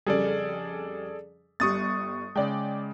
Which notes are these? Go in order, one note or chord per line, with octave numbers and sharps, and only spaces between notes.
F2 C#3 G3 G#4 A4 D5
G1 G3 C#6 D#6 A6
C#3 G#3 D5 G5